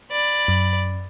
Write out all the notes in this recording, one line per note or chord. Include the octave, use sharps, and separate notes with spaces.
D5 B5
F#2